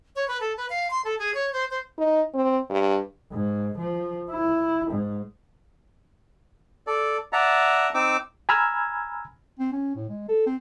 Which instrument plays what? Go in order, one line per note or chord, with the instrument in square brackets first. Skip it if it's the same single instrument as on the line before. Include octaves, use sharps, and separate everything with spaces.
[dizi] C#5
B4
A4
B4
F5
C6
A4
G#4
C#5
C5
C5
[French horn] D#4
C4
G2
[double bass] G#2
F3
E4
G#2
[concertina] A4 D5
D5 E5 F#5 A5 A#5
C4 D#4 D6 E6
[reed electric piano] G#5 A#5 B5 E6 F6 G#6
[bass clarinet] C4
C#4
A2
G#3
A4
C4